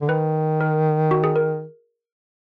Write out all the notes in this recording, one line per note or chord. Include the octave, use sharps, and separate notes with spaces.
D3
D#3 B4
A#4
F#4
G#4
A#4